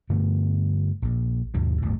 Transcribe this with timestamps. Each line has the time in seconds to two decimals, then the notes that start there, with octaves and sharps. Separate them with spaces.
0.09 G2 D3 A3 B3
1.02 A#1 A#2
1.54 D#2 G#2 B2
1.82 D1 G1 F2 A2